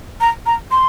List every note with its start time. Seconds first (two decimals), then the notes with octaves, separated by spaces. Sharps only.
0.21 A#5
0.46 A#5
0.71 C6